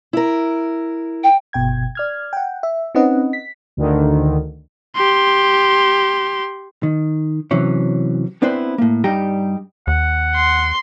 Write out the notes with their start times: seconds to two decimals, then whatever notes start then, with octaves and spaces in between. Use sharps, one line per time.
0.13 E4 A#4
1.24 G5
1.53 G1 B2 G5 G#6
1.95 D5 F6 G#6
2.33 F#5 G5
2.63 E5
2.95 C4 C#4 D#4 B4 D#5 F#5
3.33 B6
3.77 D2 D3 D#3
4.96 G4 C6
6.83 D#3
7.51 C3 E3 F#3 C#4
8.42 B3 C4 D4 E4 B4 C5
8.78 A2 A#3
9.04 G2 G3 D#4 G4 A#5
9.87 D#2 F#5
10.35 C6